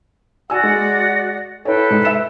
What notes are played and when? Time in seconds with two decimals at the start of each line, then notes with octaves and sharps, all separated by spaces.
0.50 F#4 D5 F#5 G#5 E6
0.63 G#3
1.65 E4 A4 B4 C#5 G5
1.91 G#2
2.05 E5 E7